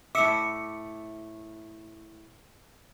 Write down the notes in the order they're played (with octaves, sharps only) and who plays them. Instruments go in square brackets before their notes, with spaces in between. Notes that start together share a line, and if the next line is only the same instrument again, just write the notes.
[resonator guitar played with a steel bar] A2 E5 [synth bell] D6 C#7